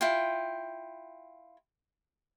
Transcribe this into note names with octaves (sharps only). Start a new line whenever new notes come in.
E4 F4 G5